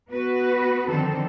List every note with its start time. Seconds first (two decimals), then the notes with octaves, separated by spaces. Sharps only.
0.10 B3 F#4 B4
0.88 D3 D#3 F3 C4 A4